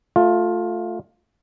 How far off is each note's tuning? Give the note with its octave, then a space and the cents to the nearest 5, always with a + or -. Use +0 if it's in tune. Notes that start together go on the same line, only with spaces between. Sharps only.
A3 +0 F4 +15